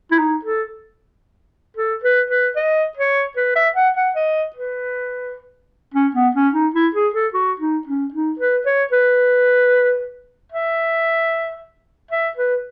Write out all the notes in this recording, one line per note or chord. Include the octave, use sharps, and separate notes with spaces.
E4
D#4
A4
A4
B4
B4
D#5
C#5
B4
E5
F#5
F#5
D#5
B4
C#4
B3
C#4
D#4
E4
G#4
A4
F#4
D#4
C#4
D#4
B4
C#5
B4
E5
E5
B4